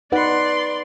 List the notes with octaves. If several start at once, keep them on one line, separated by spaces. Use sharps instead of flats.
D#4 B4 D5 F#5 C6